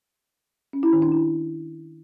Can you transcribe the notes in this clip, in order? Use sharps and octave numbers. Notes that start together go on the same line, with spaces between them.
C#4
E4
D#3
D4
E4